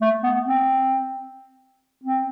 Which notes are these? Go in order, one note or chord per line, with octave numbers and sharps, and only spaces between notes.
A3
B3
C4
C4